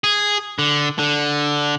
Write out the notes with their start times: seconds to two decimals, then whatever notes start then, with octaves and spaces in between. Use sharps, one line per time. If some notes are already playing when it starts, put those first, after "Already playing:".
0.04 G#4
0.59 D3
0.99 D3